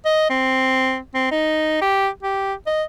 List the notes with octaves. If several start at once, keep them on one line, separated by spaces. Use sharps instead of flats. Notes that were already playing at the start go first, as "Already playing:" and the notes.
D#5
C4
C4
D#4
G4
G4
D#5